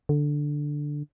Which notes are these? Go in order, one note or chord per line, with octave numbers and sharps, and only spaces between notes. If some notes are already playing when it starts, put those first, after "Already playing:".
D3